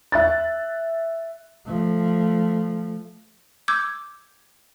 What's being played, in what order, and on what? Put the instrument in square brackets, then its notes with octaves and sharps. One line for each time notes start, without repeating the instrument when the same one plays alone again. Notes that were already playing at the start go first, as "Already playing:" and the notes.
[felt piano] E5 F#6 A6
[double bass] F3 A3
[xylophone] D6 E6 G6 G#6